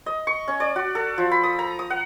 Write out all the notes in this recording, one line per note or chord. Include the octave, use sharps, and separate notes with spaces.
D#5
C#6
C#4
D5
F#4
A4
F3
B5
D#6
A#5
D#6
F#5